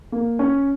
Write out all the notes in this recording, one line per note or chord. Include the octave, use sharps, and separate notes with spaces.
A#3
C#4